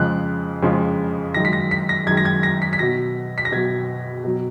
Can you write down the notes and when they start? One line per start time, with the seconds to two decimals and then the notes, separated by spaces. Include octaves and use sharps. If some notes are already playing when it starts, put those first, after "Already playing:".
Already playing: F2 C#3 F3 G#3 F#6
0.62 F2 C#3 F3 G#3
1.34 F#2 D#3 G#3 A#6
1.45 B6
1.53 A#6
1.71 B6
1.89 A#6
2.07 F#2 D#3 G#3 G#6
2.17 A#6
2.25 G#6
2.43 A#6
2.62 B6
2.73 B6
2.79 B2 F#3 A#6
3.38 B6
3.45 A#6
3.52 B2 F#3 G#6
4.24 B2 F#3